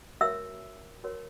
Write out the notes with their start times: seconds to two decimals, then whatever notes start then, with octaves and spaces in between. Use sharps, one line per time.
0.21 F#4 A#4 C#5 E5 E6
1.04 F#4 A#4 C#5